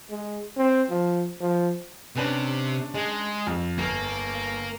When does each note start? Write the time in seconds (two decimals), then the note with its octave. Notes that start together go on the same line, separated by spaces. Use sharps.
0.10 G#3
0.57 C4
0.90 F3
1.41 F3
2.16 C3 C#4 D4 B4
2.95 G#3
3.47 F2
3.78 G1 A#3 A#4